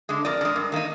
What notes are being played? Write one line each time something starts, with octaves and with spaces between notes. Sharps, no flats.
D3 G#3
F2 A#4 D5
D3
G#3
G2
D#3 A#3 D#4